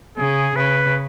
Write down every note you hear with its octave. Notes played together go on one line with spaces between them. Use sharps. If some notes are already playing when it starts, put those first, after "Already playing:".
C#3 G#4
C#3 B4